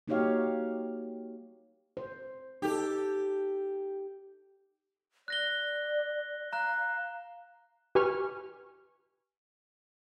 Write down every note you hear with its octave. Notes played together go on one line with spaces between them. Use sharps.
A#3 D#4 F#4 G4 C#5 F5
C5
D#4 G4 A4
D5 F#6 A#6 G7
F5 A#5 F#6
G4 B4 G#5 C#6 F6